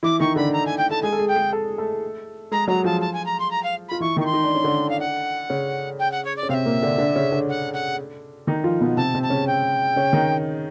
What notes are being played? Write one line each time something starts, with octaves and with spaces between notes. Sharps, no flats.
E3 E4 D6
D#3 D#4 C#6
D3 D4 B5
A#5
G#5
G5
A4 A5
G#3 G#4 G#5
A4
G#3 G#4
G5
G#3 G#4
A4
A3 A4
G#3 G#4 A#5
F#3 F#4 A#5
F3 F4 A5
A5
G#5
A#5
C6
A#5
F5
F4 B5
E3 E4 C#6
D#3 D#4 C#6
C6
D#4
D4
C#4
D3 D4
F5
F#5
C#3 C#4
G5
F#5
C#5
D5
C#4
C3 C4 E5 F5
A#2 A#3
D3 D4
D3 D4
C#3 C#4
D3 D4
F#5
F#5
D#3 D#4
F3 F4
B2 B3
C3 C4 A5
C3 C4
A5
C#3 C#4
G5
C#3 C#4
D#3 D#4